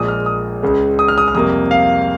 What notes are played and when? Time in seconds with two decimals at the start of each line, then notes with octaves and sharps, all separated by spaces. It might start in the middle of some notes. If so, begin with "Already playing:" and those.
Already playing: A#1 A#2 G#3 D#6
0.08 F6
0.26 D#6
0.62 C#2 C#3 G#3
0.99 D#6
1.08 F6
1.18 D#6
1.28 F6
1.35 F2 C3 G3 A#3 D#6
1.71 F5